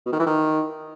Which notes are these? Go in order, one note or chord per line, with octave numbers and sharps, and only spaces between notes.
B2
D#3
E3
D#3